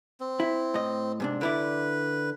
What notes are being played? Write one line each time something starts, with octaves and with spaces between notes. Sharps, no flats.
C4
E4
A2 D#5
G#2 C3 D4
D3 E4 B4 D5